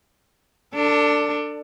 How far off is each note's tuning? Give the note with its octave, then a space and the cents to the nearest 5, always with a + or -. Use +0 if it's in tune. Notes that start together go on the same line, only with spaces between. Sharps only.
D4 +0 A4 +35